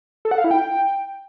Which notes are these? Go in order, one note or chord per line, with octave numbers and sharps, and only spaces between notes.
A4
F#5
F5
E4
G5